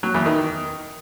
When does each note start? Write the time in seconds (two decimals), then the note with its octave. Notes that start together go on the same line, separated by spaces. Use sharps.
0.03 F#3
0.14 E2
0.26 D#3